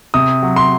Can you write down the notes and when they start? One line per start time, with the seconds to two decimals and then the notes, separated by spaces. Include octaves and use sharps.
0.14 C3 D#6
0.43 F#3
0.56 C6